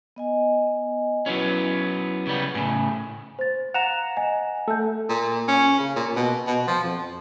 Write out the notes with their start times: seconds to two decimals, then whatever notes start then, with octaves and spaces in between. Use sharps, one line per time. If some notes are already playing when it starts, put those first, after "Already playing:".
0.16 B3 D#5 G#5
1.26 F#3 B3 C#4 E4 B4
2.27 C#3 G3 B3
2.55 A2 C#3 G#5
3.39 C5 A6
3.74 F5 F#5 A#5 E7 F7
4.17 D#5 G#5
4.68 A3 A4 E5 G6
5.09 A#2
5.48 C#4
5.79 C#3
5.96 A#2
6.16 B2
6.47 B2
6.67 F3
6.84 F2